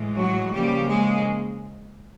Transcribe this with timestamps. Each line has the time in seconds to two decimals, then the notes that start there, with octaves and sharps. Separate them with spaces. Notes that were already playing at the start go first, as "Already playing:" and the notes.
Already playing: A2 E3 G#3
0.17 F#3 F#4
0.52 C#3 F3 G3 A#3 C#4 G4
0.87 G#3 G#4